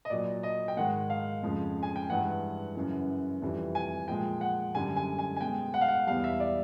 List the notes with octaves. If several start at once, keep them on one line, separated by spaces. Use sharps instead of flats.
D#5
A#2 F#3 D5
D#5
G5
G#2 D#3 G#3 F#5
F5
F2 C#3 F3 G#3
G#5
G5
G2 E3 G#3 F#5
F#2 C#3 E3
F2 C3 E3 G3
G#5
A#2 F3 G#3 G5
F#5
F#2 D3 G3 G#5
G#5
G#5
G#5
B2 G#3 G5
F#5
F5
F#5
E2 B2 G3 F5
E5
D5